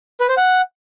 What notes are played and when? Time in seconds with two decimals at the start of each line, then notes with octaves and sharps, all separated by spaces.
0.20 B4
0.29 C5
0.37 F#5